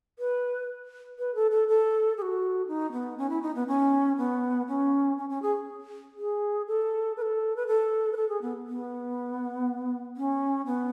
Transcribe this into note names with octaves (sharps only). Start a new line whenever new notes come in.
B4
B4
A4
A4
A4
G#4
F#4
D#4
B3
C#4
E4
D#4
B3
C#4
B3
C#4
C#4
C#4
G#4
G#4
A4
B4
A4
B4
A4
B4
A4
G#4
B3
B3
C#4
B3